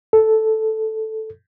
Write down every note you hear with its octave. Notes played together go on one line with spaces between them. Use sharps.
A4